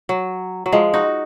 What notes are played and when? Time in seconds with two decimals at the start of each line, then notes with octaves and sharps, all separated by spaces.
0.09 F#3
0.66 F#3
0.72 F3 G#3
0.94 D#4 F#4